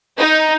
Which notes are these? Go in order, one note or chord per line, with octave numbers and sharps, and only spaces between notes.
D#4